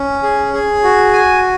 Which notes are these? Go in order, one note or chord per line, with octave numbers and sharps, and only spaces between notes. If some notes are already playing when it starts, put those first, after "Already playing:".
Already playing: C#4
G#4
G#4
F#4
G#5